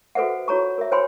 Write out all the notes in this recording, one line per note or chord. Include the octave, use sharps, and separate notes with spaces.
F#4 A4 B4 C5 E5 F#5
F4 F#4 C#5 A#5 C#6
A#4 E5
C5 C#5 G5 G#5 B5 C6